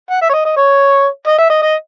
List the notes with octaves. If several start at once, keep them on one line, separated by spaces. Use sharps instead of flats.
F#5
E5
C#5
D#5
D#5
C#5
D#5
E5
D#5
D#5